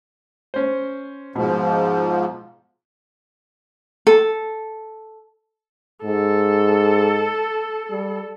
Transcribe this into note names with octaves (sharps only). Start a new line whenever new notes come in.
C#4 C5
G#2 B2 F3
A4
G#2 A4
G3